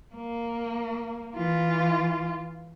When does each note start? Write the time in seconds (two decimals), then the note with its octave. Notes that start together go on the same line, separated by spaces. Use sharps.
0.15 A#3
1.36 E3 F4